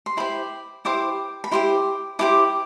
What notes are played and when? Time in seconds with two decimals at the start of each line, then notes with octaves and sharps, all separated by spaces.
0.06 C6
0.17 E4 G4 C5 B5
0.85 E4 G4 C5 D6
1.44 B5
1.51 E4 G4 C5 C6
2.19 E4 G4 C5 D6